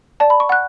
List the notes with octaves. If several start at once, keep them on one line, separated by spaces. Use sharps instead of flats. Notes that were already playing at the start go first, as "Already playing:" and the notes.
D5 A5
B5
C#6
F#5 F#6